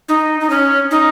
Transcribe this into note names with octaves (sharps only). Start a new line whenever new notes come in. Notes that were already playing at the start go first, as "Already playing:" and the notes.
D#4
D#4
C#4
D#4